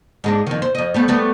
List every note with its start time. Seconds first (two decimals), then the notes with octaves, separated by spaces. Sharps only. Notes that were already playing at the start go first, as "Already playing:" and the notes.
0.24 G#2 G#3 D4
0.47 F2 D#3
0.62 C5
0.75 F2 D#5
0.94 G3 A3 B3
1.08 G3 A3 B3